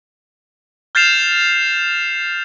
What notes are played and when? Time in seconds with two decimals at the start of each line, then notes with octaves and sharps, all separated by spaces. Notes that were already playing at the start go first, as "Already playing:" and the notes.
0.95 F6 G6 A6 C7 E7 F7